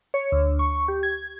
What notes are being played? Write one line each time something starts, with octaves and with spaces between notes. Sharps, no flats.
C#5
D2
C#6
G4
G#6